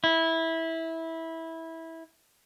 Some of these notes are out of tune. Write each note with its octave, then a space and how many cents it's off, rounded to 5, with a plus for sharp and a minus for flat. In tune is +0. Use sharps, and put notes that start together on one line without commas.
E4 -15